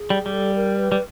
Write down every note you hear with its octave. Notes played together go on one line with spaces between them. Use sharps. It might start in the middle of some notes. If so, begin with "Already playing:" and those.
Already playing: G#4
G3
G3
A4
A#4
B4
G3